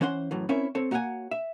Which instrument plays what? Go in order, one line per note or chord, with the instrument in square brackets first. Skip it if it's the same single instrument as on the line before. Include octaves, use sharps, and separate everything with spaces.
[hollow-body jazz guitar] E3 C#4 C5 F#5 C6
F#2 A2 E3
C4 C#4 E4 A#4 C#5 E5
C4 A4 C#5
A#3 F#4 C#5 E5 F#5 G#5
E5